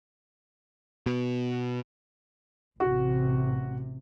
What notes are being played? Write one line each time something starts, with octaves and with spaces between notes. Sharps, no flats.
B2
A1 C3 F#4